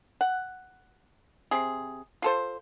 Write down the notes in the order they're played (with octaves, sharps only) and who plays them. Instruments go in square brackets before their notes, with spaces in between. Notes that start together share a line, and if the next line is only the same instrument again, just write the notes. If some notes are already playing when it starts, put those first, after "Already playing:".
[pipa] F#5
C3 C4 G#4
F4 A4 C5